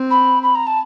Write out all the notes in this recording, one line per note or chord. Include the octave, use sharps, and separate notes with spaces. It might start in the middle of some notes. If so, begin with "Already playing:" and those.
Already playing: C4
B5
B5
A#5
A5